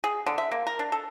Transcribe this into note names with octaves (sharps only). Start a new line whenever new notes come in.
G#4
D3
E5
A#3
A#4
D4
A4